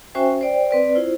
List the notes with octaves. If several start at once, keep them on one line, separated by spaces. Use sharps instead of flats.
C#4 F#4 C5 E5 G5 G#5
C5 D5 G5
C4 B4 D5
E4 F4 C5